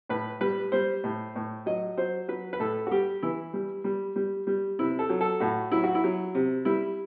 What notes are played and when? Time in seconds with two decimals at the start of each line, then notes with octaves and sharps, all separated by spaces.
0.09 A2 B4
0.41 G3 B4
0.72 G3 C5
1.04 A2
1.36 A2
1.66 F#3 D#5
1.98 F#3 C5
2.28 F#3 B4
2.53 B4
2.60 A2 A4
2.87 F#4
2.91 G3 G4
3.23 E3 E4
3.53 G3
3.84 G3
4.16 G3
4.47 G3
4.79 C3 E4
4.99 A4
5.09 F#3
5.21 A4
5.40 A2 F#4
5.72 F#3 E4
5.84 F#4
5.95 E4
6.04 F#3
6.35 C3
6.65 G3 E4